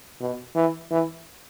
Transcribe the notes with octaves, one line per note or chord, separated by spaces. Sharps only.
B2
E3
E3